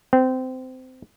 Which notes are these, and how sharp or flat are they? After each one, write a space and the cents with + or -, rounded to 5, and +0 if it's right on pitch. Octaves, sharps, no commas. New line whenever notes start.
C4 -20